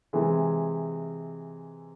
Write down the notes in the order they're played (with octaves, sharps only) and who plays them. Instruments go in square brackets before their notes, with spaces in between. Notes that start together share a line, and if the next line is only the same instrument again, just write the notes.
[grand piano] C3 E3 G#3